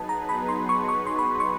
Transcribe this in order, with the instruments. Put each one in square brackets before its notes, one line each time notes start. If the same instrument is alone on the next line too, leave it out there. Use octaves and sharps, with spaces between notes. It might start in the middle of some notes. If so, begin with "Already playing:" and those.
Already playing: [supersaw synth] F#3 B3 D#4 G#4 B4 [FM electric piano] A5
[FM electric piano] A#5
B5
C6
C#6
C#6
C6
B5
C#6